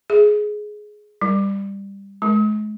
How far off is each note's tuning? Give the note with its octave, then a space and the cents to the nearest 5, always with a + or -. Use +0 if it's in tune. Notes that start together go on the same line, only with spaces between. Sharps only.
G#4 +15
G3 +15
G#3 +40